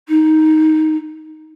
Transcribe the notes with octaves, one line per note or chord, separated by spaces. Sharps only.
D#4